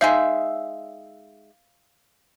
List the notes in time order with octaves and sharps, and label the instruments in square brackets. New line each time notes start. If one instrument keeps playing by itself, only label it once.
[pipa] G#3 D#4 E5 [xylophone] F5 G6